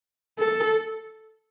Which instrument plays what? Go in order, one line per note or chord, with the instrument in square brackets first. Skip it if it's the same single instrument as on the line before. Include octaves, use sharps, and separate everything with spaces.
[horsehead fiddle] A4